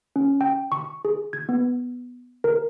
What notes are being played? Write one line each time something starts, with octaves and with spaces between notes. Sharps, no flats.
C#4
G5
C#6
G#4
G#6
B3
A#4